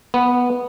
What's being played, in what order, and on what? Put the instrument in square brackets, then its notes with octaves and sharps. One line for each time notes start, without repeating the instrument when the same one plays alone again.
[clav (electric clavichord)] B3